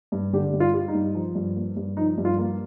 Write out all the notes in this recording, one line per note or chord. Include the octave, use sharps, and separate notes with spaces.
G2
D3 G4
G2
F4
G3
D#4
G2
F3
G2
A#3
G2
F3 D#4
G2
F4
A#3